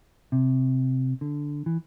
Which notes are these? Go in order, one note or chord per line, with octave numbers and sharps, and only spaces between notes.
C3
D3
E3